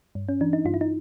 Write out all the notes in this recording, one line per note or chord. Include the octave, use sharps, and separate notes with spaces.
G2
C#4
E3 D4
D#4
G2 F4
E4
D#4